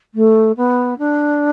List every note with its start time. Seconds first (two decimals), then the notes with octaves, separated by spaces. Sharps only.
0.14 A3
0.57 B3
0.98 D4